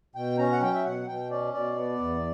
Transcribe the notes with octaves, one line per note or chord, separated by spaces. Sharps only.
B2 G5
C#4 A#5
F#5
F#3 G5
E5
B2 F#5
B2 G5
C#4 D5
B2 D5
B3
E2